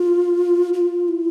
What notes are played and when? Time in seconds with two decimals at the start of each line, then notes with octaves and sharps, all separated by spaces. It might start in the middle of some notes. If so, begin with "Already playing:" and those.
Already playing: F4
0.74 F4
1.08 E4